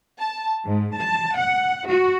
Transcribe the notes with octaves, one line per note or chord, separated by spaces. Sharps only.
A5
G#2
A5
F#5
F#4